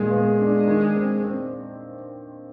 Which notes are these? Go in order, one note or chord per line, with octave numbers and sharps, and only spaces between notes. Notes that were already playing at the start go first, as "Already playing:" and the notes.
Already playing: A#2 D#3 G#3
B3
D4
D#3
C4
C4